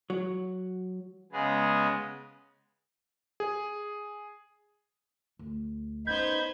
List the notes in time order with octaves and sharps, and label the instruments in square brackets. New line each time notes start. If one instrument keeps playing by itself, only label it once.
[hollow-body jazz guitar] F#3
[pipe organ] C#3 G#3 B3 G#4
[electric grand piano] G#4
[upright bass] D2
[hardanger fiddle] B3 C5 [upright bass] C#4 [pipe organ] D#4 B5 G#6 [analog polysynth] G6